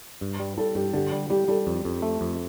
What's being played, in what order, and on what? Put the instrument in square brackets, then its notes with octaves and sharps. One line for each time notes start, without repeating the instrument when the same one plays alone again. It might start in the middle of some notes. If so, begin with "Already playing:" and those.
[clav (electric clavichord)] G2
G3
[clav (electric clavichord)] G3 [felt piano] A4
[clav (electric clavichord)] G2 [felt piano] G4
[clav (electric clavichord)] D3 [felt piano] G4
[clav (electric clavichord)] G3
[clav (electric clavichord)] G3 [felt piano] G4
[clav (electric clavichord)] G3 [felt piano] A4
[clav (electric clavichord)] F2
F2
A3
F2